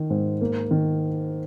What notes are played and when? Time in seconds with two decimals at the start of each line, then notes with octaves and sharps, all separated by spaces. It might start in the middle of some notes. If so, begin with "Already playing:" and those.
Already playing: D#3
0.10 G#2
0.41 A#3
0.71 D#3